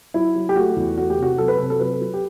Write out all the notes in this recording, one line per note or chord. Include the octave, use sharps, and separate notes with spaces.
F#3 E4
F#3
G4
A3 F#4
E2
A3 F#4
G4
C3 F#4
F#3 A4
B4
C3 A4
A4
F#3 B4
F#3
G4